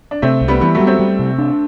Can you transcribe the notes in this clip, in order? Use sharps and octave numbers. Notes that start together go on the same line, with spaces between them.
D4
C3 A3 C4
C2
G3 B3
E3 G3 B3
F#3 A3
G3
A3 C4
G3
C3
D4